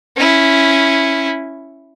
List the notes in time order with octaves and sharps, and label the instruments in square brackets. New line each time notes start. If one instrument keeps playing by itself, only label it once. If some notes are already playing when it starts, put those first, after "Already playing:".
[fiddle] C#4 E4